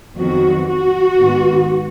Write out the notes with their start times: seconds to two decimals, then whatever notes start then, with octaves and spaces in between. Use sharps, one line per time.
0.17 F2 D#3 F#3 B3 F#4
0.68 F#4
1.18 G#2 D#3 G#3 B3